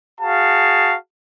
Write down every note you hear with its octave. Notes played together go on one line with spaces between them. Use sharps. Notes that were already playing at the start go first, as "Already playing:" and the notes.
F#4 G#4 F5 A5